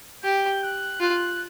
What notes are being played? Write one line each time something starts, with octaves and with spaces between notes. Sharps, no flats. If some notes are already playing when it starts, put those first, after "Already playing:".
G4 G6
F#6
F4 F#6